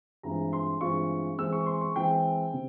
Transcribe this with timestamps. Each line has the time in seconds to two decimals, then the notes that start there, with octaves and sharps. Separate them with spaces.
0.23 G2 E3 G#3 C4 F4 A#5
0.53 C6
0.81 G2 E3 G#3 C4 F4 C#6
1.38 E3 G#3 C4 E6
1.53 C#6
1.66 C6
1.81 C#6
1.96 E3 G#3 C4 G5
2.54 C3